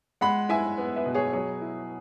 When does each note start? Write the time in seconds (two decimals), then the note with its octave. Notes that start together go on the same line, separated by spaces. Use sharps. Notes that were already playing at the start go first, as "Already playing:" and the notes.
0.21 G#3 F#5 B5
0.49 E4 E5 G#5
0.78 B3
0.96 B4 E5
1.06 B2
1.15 G#4 C#5
1.33 F#3 G#4 C#5
1.61 E4